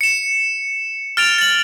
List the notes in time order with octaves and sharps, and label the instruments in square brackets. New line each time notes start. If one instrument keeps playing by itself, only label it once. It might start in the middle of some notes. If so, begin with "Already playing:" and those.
[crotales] C#7 E7
F6 A6 D7 F7
A6 F#7